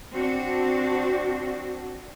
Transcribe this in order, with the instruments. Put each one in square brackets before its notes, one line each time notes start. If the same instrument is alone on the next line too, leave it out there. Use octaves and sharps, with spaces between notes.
[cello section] C4 D4 F#4